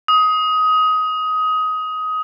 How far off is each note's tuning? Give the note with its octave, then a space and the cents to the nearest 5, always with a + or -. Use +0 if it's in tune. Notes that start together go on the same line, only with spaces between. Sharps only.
D#6 +20